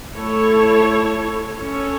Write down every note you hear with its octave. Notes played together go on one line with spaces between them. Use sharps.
A3 E4 A4 C#5
C#4 A4 C#5